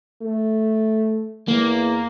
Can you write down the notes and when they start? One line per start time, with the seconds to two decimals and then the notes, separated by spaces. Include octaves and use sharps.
0.22 A3
1.48 E2 A#3